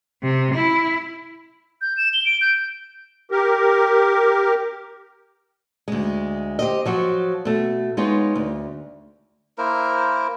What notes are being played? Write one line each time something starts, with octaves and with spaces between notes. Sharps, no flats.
C3
E4
G6
E7
G7
D7
G6
G4 A#4
D2 G#3
G4 C5 D#5
F3 F#3 F#4
B2 A3
G#3 B3 D#4 F4 C#5
D2
A#3 E4 A#4 C5